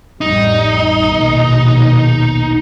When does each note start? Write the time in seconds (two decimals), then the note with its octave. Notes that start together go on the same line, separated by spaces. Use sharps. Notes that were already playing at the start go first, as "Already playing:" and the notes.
0.21 A1 F2 G3 D#4
0.94 A#1 D#2 B2